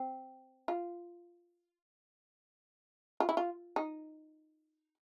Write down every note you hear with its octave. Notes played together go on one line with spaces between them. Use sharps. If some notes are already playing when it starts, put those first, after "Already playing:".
Already playing: C4
F4
F4
E4
F4
D#4